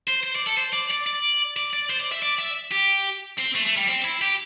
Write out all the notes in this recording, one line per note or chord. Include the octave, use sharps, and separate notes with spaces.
C5
C5
D5
A4
C5
D5
D5
D5
D5
D5
C5
D5
E5
D5
E5
G4
C4
A3
A3
G3
C4
E4
G4